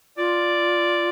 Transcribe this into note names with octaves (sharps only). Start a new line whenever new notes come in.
F4 D5